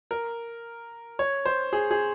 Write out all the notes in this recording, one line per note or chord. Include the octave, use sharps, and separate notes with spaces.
A#4
C#5
C5
G#4
G#4